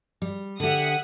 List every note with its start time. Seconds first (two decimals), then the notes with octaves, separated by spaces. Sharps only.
0.22 G3
0.60 D3 G4 E5 F#5 D#6